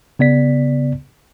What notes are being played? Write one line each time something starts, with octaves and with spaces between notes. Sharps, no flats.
C#3 B3 D5 B6